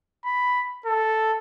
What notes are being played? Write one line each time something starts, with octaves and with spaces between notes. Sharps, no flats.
B5
A4